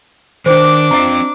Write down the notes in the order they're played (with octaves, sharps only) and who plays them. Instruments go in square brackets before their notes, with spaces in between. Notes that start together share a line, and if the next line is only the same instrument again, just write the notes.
[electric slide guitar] D#3 [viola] D4 D6 [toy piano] C5
[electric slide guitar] C4 F4 F5 [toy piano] D#5 A#5